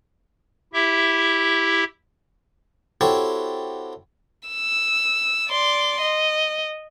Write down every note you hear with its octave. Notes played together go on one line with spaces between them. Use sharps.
E4 G4 E5
C4 E4 F#4 G4 A4 C#5
E6
D5 C6
D#5